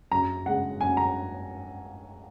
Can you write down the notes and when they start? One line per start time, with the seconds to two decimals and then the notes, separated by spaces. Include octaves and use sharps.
0.11 F#2 A#5
0.45 C#3 G#3 F#5
0.80 F#2 G#5
0.97 A#5